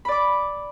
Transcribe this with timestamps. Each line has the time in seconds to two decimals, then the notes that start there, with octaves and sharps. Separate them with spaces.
0.05 B5
0.08 D5
0.12 D6